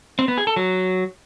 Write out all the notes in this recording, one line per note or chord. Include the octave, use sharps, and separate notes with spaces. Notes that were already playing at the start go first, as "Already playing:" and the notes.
C4
B3
G#4
A4
F#3